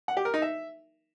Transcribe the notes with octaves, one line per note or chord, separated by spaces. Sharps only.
F#5
G4
A#4
D#4
E5